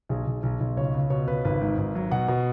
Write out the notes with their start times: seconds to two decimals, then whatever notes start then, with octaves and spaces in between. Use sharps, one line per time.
0.09 B1 G#4
0.27 B1
0.43 B1
0.60 B1
0.77 C#2 C#5
0.94 C#2
1.10 B2 C#5
1.27 C#2 B4
1.45 G#1 B4
1.61 G#2
1.78 G#1
1.95 F#3
2.11 B2 F#5
2.28 B2